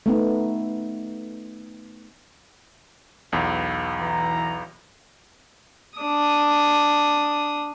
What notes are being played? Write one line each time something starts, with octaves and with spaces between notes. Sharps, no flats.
A3 B3 D#4
B1 E2
E3 A#5
D4 D#6